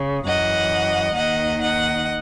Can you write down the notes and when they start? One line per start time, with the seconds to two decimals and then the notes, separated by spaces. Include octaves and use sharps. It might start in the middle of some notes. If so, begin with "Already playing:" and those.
Already playing: C#3
0.25 F#2 E3 D#5 F#5
1.16 D#2 D#3 D#5 F#5
1.60 D#5 F#5